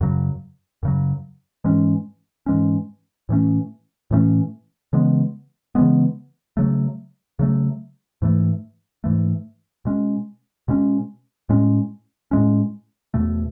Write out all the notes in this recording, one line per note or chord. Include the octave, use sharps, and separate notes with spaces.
F#2 C#3 F#3
F#2 C#3 F#3
G#2 E3 G#3 C#4
G#2 E3 G#3 C#4
A2 E3 A3 C#4
A2 E3 A3 C#4
C#3 E3 G#3 B3
C#3 E3 G#3 B3
C#3 F#3 A3
C#3 F#3 A3
G#2 E3 A3
G#2 E3 A3
B2 G#3 C#4
B2 G#3 C#4
A2 G#3 C#4
A2 G#3 C#4
E2 B2 A3